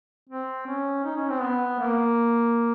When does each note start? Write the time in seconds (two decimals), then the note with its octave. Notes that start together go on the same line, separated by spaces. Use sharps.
0.30 C4
0.67 C#4
1.04 D#4
1.16 C#4
1.29 C4
1.42 B3
1.79 A#3